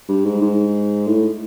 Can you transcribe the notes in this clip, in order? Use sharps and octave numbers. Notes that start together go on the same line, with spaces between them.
G2
G#2
G#2
A2